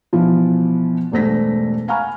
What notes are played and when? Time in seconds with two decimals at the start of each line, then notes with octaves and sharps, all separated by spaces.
0.13 B2 E3 F3 F4
1.12 E1 G2 A3 C5 A#6 B6
1.88 F5 G#5 A#5 B5 C#6 F6